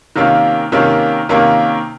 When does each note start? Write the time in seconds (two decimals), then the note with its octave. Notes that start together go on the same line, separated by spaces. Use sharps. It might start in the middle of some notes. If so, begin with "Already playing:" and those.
0.16 C3 D#3 A#3 C#4 F4
0.72 C3 D#3 A#3 C#4 F4
1.29 C3 D#3 A#3 C#4 F4